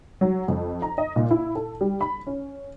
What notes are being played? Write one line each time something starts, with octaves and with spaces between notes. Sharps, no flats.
F#3
F2
A#5
D#5
A#2
E4
A4
G3
B5
C#4